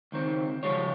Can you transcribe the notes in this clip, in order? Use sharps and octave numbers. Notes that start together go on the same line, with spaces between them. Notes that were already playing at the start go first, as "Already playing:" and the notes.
C#2 D#3 C4
C#3 F3 G3 G#3 F4 C#5